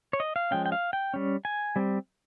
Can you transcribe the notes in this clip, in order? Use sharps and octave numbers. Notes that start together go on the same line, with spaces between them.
C#5
D#5
F5
F3 G#3 C#4 G5
G5
F5
G5
G3 C#4
G#5
G3 C4